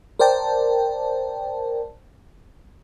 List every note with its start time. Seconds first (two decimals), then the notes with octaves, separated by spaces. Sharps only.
0.19 A#4 C5 D5 G5 A5